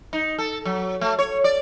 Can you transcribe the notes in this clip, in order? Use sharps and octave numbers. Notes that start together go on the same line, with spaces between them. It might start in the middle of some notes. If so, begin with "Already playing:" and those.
D#4
A4
F#3
A3
C#5
D5